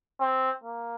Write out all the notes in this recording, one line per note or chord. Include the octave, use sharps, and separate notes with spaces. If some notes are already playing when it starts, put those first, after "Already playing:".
C4
A#3